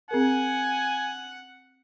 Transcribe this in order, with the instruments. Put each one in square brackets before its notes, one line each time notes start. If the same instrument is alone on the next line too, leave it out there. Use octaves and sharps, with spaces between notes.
[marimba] C4 G#4 A#4 [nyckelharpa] F#5 [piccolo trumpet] G#5